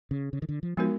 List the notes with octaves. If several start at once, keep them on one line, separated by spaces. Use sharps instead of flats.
C#3
C#3
D#3
D3
F3
F3 G#3 B3 D#4 F#4 A#4